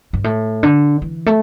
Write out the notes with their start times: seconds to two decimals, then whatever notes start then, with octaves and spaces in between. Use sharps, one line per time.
0.13 G2
0.24 A2
0.63 D3
1.02 E3
1.26 A3